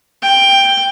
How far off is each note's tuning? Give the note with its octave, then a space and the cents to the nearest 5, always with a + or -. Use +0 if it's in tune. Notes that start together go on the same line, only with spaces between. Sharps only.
G5 +10